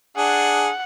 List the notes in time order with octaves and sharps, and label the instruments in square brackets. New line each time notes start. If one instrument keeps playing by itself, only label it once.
[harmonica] D4 G#4 [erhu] F#5